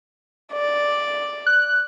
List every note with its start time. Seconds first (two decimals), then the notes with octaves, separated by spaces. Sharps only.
0.53 D5
1.46 F#6